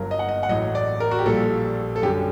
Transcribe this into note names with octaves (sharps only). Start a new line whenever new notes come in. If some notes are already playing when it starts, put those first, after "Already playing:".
Already playing: G1 G2 F#3 A#4
D#5
F#5
D#5
F#5
A1 A2 F#3 D#5
D5
A#4
F#4
G4
A#1 A#2 G3 A4
A4
F#2 D3 G3 G4